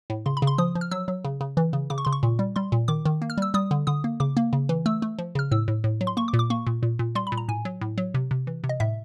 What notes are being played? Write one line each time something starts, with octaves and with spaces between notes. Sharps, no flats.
A2
C#3 C6
B5
C#3
C6
F3 D#6
F3
F6
F#3 E6
F#3
C#3
C#3
E3
C#3
C#3 D6
C#6
C#3 C6
C#6
A#2
G3
G3 C6
A#2
D#3 D6
D#3
A#3
F6
G3 E6
G3 D#6
D3
D3 D#6
A#3
C#3 D6
A#3
C#3
E3
A3 E6
A3
F3
C#3 F6
A2 E6
A2
A2
F#3
C6
A#3 C#6
D6
A#2
D6
A#3 C#6
A#2
A#2
A#2
G3 C6
B5
A#2
A#5
A2 G#5
F#3
A2
F#3
C3
C3
E3
C3
D#5
A2 E5